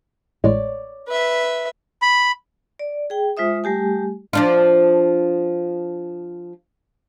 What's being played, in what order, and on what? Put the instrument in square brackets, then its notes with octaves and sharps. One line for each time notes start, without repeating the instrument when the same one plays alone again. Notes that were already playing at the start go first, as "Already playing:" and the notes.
[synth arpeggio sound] A1 A2 G#3 [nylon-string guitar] C#5 D5
[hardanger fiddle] B4 E5
[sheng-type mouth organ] B5
[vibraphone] D5
G#4 G5
G#3 F4 C5 E5 D#6
G3 A3 G4 G#5
[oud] F3 D4 F4